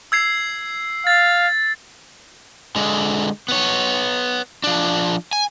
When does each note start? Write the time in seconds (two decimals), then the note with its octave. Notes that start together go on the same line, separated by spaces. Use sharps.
0.12 E6 G#6 C7
1.07 F5 A6
2.76 D3 G#3
3.48 B3 C#5
4.64 F3 D4
5.33 G#5